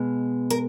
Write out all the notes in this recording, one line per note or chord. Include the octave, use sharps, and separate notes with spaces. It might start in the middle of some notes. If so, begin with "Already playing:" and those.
Already playing: B2 G#3
A#4